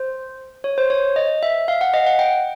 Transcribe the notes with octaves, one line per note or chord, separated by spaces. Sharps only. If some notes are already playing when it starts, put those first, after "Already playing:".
Already playing: C5
C#5
C5
C#5
D#5
E5
F5
F#5
D#5
F#5
G5